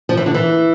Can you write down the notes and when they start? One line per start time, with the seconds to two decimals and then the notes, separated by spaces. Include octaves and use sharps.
0.09 F3
0.17 E3
0.26 D3
0.34 E3